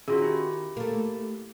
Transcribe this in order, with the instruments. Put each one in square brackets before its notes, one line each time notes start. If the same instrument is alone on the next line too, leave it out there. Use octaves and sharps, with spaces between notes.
[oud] D#3 [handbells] C#4 F4 F#4 [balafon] G#4
[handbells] E4 G4
[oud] A3 A#3